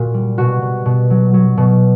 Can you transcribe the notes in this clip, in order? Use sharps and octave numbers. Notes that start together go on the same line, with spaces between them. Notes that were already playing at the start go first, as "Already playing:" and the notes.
Already playing: A#2 F#4
G3
B2 F#4
B2
B2
F#3
F#3
B2